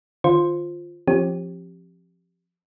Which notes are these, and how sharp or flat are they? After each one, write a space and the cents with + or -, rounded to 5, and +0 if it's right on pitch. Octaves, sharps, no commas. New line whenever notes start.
D#3 -25 F4 +0 C5 +0
F3 +0 C4 +45 G4 +0